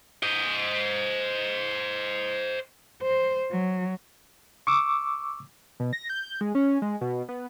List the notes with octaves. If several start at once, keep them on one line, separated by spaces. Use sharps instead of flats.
C5 D#5
C5
F#3
C#6 D6 E6
B2
A#6
G6
G#3
C#4
G#3
B2
B3